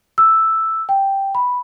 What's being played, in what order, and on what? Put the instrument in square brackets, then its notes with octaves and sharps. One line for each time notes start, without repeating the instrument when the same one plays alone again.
[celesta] E6
G5
B5